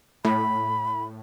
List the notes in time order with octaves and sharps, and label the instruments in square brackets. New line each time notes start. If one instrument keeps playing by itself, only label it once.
[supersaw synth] A2 [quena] B5